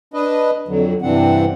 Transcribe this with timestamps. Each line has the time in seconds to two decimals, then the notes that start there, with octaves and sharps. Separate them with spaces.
0.14 D4 B4 D#5
0.68 F2 D3 F#3
1.02 G2 C3 E3 C4 D4 F#5